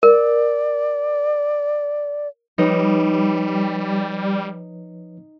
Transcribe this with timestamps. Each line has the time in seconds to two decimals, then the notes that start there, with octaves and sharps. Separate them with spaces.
0.03 A#4 D5
2.58 F3 G3 D#4 B4 C#5